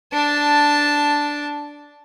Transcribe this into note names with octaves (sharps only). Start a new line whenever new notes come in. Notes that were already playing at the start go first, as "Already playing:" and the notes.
D4 A5